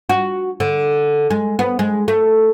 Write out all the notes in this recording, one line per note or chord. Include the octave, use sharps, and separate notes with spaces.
F#4
D3
G#3
B3
G#3
A3